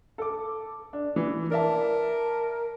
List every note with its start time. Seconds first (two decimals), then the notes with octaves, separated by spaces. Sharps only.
0.18 A4 D6
0.93 D4
1.16 E3
1.51 A#4 D5 E5 A5